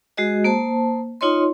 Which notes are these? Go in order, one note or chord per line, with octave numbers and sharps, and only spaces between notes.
G#3 F#4 G#4 D#5
A#3 C5 A5
D#4 F4 C#5 D#5 C6